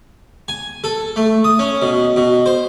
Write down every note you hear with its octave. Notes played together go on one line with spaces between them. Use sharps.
G#5
A4
A3
D#6
C#4
B2
B2
C5